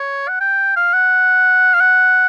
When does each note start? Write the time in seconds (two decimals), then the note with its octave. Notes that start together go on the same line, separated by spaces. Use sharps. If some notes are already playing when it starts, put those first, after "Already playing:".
Already playing: C#5
0.28 F#5
0.41 G5
0.76 F5
0.94 F#5
1.74 F5
1.80 F#5